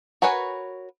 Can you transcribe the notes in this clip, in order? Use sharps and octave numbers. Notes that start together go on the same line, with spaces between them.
F#4 A#4 B4 C#5 G#5